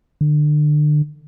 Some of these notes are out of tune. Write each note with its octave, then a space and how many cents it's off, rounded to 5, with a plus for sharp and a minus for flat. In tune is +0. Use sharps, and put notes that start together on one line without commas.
D3 +30